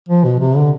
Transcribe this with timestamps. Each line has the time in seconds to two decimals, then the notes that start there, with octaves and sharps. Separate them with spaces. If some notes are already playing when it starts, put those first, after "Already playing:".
0.09 F3
0.24 B2
0.40 C3
0.56 D3